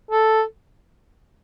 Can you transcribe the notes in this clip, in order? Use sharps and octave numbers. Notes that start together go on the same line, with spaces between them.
A4